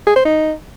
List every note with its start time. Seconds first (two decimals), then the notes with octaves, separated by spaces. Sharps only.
0.07 G#4
0.16 C5
0.25 D#4